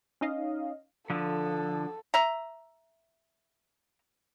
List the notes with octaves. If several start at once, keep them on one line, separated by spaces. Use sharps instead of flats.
C#4 D#4 D#5 F5
D3 F3 A4
E5 A#5